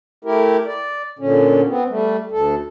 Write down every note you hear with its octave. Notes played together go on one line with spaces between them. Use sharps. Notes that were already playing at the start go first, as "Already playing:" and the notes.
A3 E4 G4 A#4
D5
A#2 D3 C#4
B3 C4
G3 A3
D2 A4